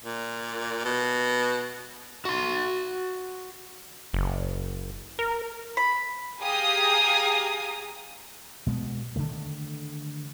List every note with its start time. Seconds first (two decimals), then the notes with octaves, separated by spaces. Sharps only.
0.04 A#2
0.85 B2
2.25 F#4 C6
4.14 F#1
5.19 A#4
5.77 B5
6.40 G4 G#4 F5 G#5 A#5 D#6
8.67 B2 G#3 A#3 B3
9.16 D3 D#3 A3